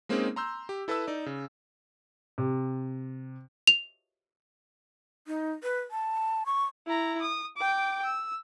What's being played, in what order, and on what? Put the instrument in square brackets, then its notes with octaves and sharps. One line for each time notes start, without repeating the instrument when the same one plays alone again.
[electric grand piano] G#3 A#3 C4 C#4 D#4 G#4
A#5 C6 E6 G6
G4
E4 A4 B4 E5 A5 E6
D#4 D5
C#3
[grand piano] C3
[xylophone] F7
[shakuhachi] D#4
B4
A5
C#6
[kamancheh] E4 A#5
D#6
G5 D6
E6